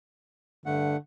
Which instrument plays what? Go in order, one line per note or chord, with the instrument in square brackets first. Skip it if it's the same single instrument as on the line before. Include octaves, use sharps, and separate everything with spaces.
[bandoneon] G2 A3 F#5 [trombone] D3